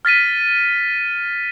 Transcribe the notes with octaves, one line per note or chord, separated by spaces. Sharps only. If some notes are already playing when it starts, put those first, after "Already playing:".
F6 A6 B6 D#7